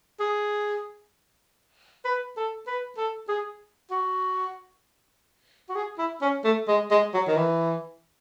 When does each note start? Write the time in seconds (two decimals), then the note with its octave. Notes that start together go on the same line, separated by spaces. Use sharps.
0.20 G#4
2.05 B4
2.37 A4
2.67 B4
2.97 A4
3.28 G#4
3.91 F#4
5.69 F#4
5.75 G#4
5.98 E4
6.21 C#4
6.44 A3
6.68 G#3
6.91 G#3
7.14 F#3
7.28 D#3
7.37 E3